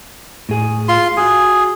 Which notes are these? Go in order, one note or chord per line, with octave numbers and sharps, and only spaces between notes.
A2 G#4
F4 C6
F#4 G#4 G#5